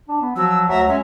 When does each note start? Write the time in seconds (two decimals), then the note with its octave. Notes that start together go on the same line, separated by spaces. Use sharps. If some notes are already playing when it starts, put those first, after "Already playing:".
0.09 D4
0.21 B3
0.36 F3 F#3 E6
0.69 D2 F#3 E5 A#5
0.87 G#3 C#4 E5